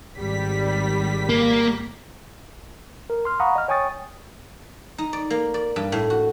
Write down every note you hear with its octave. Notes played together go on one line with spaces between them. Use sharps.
G#1 G3 B6
A#3
A#4
C6 F6
F5 F#5 A#5 B5 C#6 D#6
D#5 F6
C#5 G5 G#5 C#6 D#6 A6
D#4
D5
A#3
D5
G2
A2
F#4